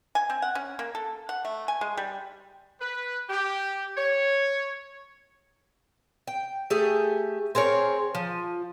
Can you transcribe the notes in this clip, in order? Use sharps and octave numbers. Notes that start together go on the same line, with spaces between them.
G#5
C4
F#5
C#4
A#3
A4
F#5
A3
G#5
G#3
G3
B4
G4
C#5
G5
A3 G4 G#4
C4 G#4 A#4 C#5
F3